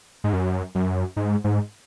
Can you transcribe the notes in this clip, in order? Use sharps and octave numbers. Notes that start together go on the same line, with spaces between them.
G#2
F#2
F#2
G#2
G#2